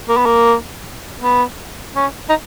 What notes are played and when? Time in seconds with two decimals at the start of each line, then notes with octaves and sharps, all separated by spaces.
0.09 A#3
0.17 B3
0.26 A#3
1.21 B3
1.95 C#4
2.29 D#4